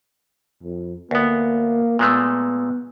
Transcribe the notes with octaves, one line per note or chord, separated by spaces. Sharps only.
F2
D2 A#3 B3
A#2 G#3 A3 B3